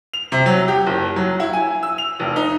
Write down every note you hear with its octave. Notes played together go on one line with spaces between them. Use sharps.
F7
C3
F#3
G4
F#1
F#3
E4
G#5
E6
F7
F1
D#4